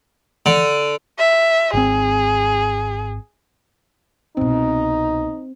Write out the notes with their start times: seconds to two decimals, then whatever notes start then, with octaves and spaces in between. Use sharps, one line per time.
0.46 D3
1.19 E5
1.73 G#1 C4 G#4
4.37 C2 B2 C4 D#4